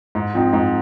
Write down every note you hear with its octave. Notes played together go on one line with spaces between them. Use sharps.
G#2
F3 C4 D#4
G#2